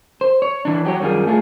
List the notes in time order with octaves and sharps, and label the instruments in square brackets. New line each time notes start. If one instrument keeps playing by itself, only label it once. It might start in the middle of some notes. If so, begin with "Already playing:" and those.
[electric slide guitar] C5
C#5
E3 D4
F#3 G4 C#5
F#2 D#3 G3 F4 G#4
A3 F4 G#4